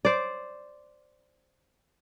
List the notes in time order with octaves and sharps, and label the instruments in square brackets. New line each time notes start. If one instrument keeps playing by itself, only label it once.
[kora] C5 D5